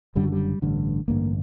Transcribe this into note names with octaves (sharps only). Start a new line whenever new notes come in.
F#1 F#2 D3 G3
F#3
G3
A1 G2 D3
A1 G2 D3 A#3